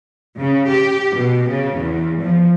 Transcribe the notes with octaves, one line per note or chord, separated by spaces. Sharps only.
C#3
G4
B2
C#3
E2
F3